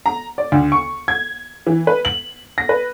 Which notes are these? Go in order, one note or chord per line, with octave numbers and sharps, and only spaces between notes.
A#5
D5
D2
C#6
G#6
E3
B4
F#7
A#6
B4